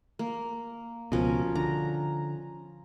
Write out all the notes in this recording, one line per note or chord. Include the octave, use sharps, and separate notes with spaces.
A#3
C#2 B2 F3 C#4 A#4
D3 A#5